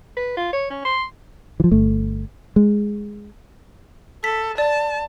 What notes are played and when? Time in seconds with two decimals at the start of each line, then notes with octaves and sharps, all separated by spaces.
0.17 B4
0.37 F4
0.53 C#5
0.71 C#4
0.85 C6
1.60 E3 F3
1.71 G1 A3
2.56 G#3
4.24 A4 B6
4.58 D5 A5